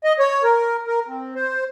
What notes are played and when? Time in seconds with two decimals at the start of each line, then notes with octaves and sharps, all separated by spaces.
0.04 D#5
0.19 C#5
0.43 A#4
0.87 A#4
1.08 C4
1.35 C5